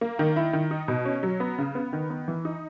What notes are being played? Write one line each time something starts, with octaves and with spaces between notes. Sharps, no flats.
A#3
D#3
E4
D#3
D#4
B2
C#4
F#3
B3
C#3
B3
D#3
B3
E3
D#4